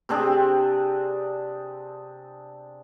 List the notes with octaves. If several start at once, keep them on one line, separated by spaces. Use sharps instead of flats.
C3 C4 D4 G#4